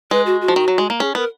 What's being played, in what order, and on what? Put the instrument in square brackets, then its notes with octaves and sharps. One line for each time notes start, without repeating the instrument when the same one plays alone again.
[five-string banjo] G#3 [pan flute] B4
[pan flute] F#4
F#4
[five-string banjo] F3
D#3
F#3
G#3
A#3
[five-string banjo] C#4 [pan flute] G#4
[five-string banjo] B3 [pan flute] A#4